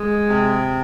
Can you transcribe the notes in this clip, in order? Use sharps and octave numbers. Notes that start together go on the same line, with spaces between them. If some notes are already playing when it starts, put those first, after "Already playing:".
Already playing: G#3
C3